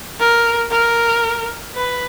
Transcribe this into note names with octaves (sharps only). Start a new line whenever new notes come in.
A#4
A#4
B4